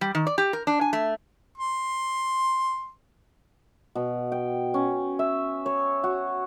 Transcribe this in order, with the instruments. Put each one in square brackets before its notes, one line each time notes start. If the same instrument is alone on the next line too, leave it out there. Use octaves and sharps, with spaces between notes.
[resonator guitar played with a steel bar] G3
D#3
D5
G4
A#4
D4
G#5
A3
[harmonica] C6
[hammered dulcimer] B2
G5
C#4
E5
C#5
F#4